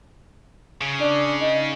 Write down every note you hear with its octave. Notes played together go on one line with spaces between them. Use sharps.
C#3
D4
D#4